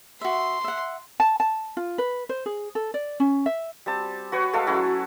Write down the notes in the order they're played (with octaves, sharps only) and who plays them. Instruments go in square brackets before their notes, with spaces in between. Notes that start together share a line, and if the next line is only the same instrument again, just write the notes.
[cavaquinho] F#4 E5 [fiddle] C6
[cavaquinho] E5 F#5
[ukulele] A5
A5
F4
B4
C5
G#4
A4
D5
C#4
E5
[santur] G3 C4 A5
F#4 B4 C#5
G#3 A3 A4 F5
F#3 C#4 E4 F#4